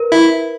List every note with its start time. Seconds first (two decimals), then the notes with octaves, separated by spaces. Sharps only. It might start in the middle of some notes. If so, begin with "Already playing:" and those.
Already playing: A#4 B4
0.12 E4